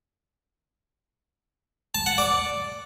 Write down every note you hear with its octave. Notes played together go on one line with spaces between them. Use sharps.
A5
F#5
D5